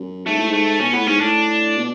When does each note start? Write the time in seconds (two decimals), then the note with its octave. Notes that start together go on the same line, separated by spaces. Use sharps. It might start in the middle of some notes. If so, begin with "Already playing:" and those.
Already playing: F#2
0.26 G#2 A3
0.38 A2
0.48 G#2 A3
0.80 B2 C#4
0.93 A2 B3
1.07 G#2 C#4
1.20 A2 D4
1.77 B2